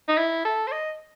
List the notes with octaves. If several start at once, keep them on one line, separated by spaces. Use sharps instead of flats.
D#4
E4
A4
C5
D#5